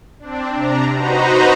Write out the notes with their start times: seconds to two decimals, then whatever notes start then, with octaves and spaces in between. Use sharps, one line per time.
0.19 C4 D4
0.55 C3 D4 A#5
0.94 D#4 F#4 B4 C5 D#5 A#5